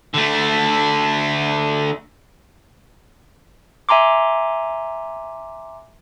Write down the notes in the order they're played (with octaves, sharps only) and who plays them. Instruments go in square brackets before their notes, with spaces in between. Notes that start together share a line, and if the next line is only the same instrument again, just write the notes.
[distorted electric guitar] D3 A3
[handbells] E5 G#5 A#5 C6 D6